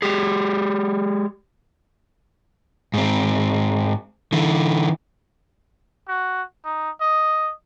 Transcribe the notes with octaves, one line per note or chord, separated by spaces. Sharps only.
G#3 G4 G#4
G#2 C4
D3 E3
F#4
D#4
D#5